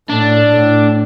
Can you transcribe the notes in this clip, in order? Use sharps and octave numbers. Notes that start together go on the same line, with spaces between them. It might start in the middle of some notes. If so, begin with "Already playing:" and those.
A2 D4
A2